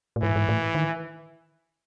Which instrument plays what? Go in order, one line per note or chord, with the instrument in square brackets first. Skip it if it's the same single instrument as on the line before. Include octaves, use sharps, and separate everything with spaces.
[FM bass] A2
[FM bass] G#2 [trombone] E3
[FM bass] G#2
A2
D#3